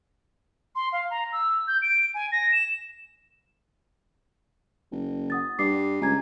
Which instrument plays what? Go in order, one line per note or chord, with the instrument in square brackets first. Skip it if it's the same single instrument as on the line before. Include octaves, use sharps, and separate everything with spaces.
[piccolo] C6
F5
A#5
E6
G6
D7
G#5
A#6
E7
[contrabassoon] F#1
[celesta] F#5 D#6 A6
[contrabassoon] G2 [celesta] D6 C7
[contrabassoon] C#2 [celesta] G#5 A#5 G#6